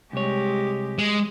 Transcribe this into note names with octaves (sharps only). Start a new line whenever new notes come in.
C2 G#3 G4 C#5
G#3